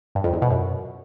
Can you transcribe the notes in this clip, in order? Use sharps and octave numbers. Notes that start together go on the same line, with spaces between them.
G2
F2
E2
B2
F#2